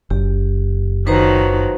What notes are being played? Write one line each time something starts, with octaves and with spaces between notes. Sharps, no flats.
F#1 G4
D#3 F3 F#3 B4 C5 A#5